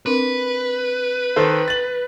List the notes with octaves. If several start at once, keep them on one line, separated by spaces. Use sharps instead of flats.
C4 D4 A#4 B4
D#3 A4 C5
A6 F#7